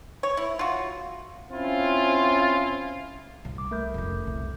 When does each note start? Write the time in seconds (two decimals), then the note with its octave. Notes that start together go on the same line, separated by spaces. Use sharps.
0.23 C#5
0.37 E4
0.59 F4 F#4
1.51 C4 C#4 E4 F4
3.45 C2 C3
3.58 D6
3.71 A3 A#4 G6
3.94 F1 C#4
4.27 C2